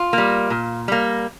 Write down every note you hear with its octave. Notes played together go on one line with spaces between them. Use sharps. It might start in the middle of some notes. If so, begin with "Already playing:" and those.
Already playing: F4
G3 A#3
A#2
G3 A#3